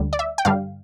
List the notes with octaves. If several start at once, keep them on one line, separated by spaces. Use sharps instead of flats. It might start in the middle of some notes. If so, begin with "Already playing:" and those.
Already playing: D2 D3 G3
D5
E5
G5
G2 D3 G3 F5